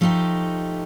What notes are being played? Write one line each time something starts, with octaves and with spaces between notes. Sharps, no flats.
F3 A3 D#4 G4